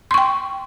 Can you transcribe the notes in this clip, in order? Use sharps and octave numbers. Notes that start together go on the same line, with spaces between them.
G5 C6 C#6